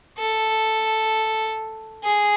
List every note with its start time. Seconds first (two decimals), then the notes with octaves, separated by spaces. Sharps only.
0.18 A4
2.04 G#4